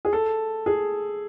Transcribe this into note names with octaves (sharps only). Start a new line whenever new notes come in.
G#4
A4
G#4